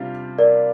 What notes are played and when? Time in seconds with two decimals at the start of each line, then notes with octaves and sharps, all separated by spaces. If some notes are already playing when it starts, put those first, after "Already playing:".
Already playing: C3 G3 D4 F4
0.38 A#4 D5